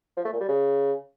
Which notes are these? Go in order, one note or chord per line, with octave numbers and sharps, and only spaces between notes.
F3
A3
A#2
G3
C#3